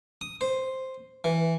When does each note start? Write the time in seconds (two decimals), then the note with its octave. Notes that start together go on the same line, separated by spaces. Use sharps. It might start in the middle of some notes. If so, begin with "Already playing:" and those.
0.21 D#6
0.41 C5
1.24 E3